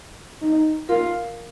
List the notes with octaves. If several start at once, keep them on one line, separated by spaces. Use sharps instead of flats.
D#4
F4 A#4